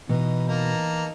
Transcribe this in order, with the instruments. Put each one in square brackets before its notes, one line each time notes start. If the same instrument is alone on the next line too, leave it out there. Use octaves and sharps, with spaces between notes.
[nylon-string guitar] B2 [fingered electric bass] E3 [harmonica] D#4
[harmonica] A#3 D#4 A5